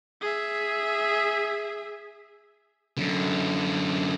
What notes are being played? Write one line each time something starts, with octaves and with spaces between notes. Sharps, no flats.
G#4 E5
F#2 D3